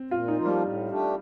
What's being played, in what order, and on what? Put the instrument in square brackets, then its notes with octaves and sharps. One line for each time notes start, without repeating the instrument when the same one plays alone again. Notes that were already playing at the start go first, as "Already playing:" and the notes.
Already playing: [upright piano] C4
[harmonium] A#2 [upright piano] F4
[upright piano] D#4
[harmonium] F3 A#3 F4
[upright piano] G3
[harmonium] A2
A3 D4 G4